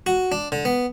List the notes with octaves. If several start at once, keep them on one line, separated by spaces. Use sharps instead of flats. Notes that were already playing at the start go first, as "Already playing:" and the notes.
F#4
D4
D3
B3